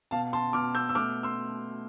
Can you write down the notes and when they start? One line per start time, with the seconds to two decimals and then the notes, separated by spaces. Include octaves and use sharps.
0.11 B2 F5 A5
0.33 A5 C6
0.53 B2 D6 F6
0.75 E6 G6
0.89 E6
0.95 A3 D6 F6
1.23 C6 E6